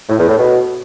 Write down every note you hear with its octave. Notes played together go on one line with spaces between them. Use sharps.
A2
E2
A2
B2